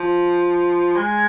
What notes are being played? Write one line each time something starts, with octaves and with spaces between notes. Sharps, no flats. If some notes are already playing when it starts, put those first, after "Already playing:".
Already playing: F3
G#3